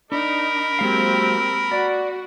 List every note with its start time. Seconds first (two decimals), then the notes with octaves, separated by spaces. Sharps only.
0.12 D4 D#4 A#4 B5
0.79 F#3 G#3 A#3 C4 G4 F5
1.72 F#4 D5